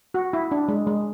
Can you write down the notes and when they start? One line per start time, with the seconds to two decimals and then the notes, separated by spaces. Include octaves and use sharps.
0.14 F#4
0.33 E4
0.52 D4
0.68 G#3
0.87 G#3